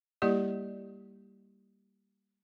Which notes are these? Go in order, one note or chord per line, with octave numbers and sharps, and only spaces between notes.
G3 A#3 E4 G4 D5